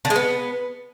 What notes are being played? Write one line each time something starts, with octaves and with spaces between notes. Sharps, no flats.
D3
G#3
B3